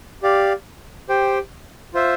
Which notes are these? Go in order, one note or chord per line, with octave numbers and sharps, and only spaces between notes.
G4 D5 F5
G4 C5 G5
F4 C5 E5